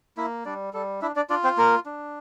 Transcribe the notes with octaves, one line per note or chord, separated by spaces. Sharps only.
A#3 E4 E5
G3 D4 D5
G3 A4
D4 E4 E5
D4 D5
D4 F4 D5
C4 C5
A#3 A#4
D4